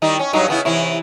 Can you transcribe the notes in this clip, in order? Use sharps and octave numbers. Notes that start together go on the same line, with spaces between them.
D#3 G3 D#4
C#4
G2 F#3 D#4
C#3 B3 E4
C3 E3 E4